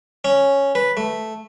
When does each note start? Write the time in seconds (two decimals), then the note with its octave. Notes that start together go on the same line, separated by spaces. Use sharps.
0.25 C#4
0.75 B4
0.97 A3